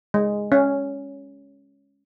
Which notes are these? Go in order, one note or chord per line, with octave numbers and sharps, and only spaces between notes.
G#3
C#4